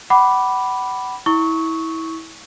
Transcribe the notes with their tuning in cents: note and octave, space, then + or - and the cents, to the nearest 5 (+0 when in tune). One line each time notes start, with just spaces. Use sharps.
F#5 +35 B5 +0 D6 +0
E4 -25 C#6 +0 E6 -40